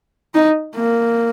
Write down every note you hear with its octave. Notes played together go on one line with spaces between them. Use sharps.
D#4
A#3